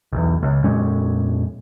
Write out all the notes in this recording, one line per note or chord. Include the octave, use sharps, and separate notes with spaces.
B1 E2
C#2
F2 A#2 G#3 C#4